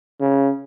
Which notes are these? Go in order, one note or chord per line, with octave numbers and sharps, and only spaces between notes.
C#3